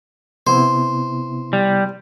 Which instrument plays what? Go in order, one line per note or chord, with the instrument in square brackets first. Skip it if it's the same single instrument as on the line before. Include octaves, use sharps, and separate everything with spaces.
[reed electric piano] C3 B3 E4 [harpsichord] C5
[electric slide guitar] G3